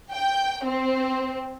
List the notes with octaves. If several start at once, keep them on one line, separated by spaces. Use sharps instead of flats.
G5
C4